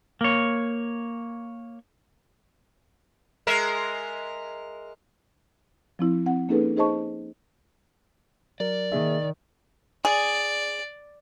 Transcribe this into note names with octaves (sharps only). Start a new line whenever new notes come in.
A#3 C#5
G#3 A#4 E5
F3 C4 E4
C4 F#5
A#3 C#4 D#4 G#4 A4 B4
D#4 G#4 C5 D#5 A5 C#6
F#3 A#4 D5
D#3 A#3 G#4 E5
G#4 D5